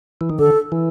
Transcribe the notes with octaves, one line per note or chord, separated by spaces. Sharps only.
E3
D#3
D3 A4
E3